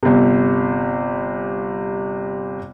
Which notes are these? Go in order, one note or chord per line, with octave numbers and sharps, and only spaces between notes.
G1 C3